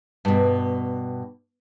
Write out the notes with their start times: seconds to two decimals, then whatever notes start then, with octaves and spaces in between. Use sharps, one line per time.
0.25 G2 B2